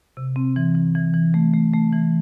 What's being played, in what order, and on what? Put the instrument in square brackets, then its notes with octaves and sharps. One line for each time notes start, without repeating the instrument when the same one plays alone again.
[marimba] C3
C4
E3
E3
E3
E3
A3
A3
A3
E3